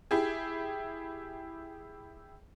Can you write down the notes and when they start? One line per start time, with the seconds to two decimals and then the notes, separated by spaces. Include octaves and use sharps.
0.11 E4 G4 G#4